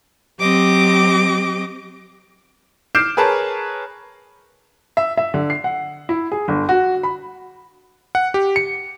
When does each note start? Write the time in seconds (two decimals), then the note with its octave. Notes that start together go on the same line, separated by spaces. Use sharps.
0.40 F#3 C4 G4 D#5 D6
2.95 D6 F6 G6 C7 D7 E7
3.17 G#4 A#4 B4 C#5 A5
4.97 E5
5.17 E5
5.34 D3
5.50 C7
5.64 F#5
6.09 E4
6.32 G#4
6.48 G1
6.69 F#4
7.03 B5
8.15 F#5
8.34 G4
8.56 C#7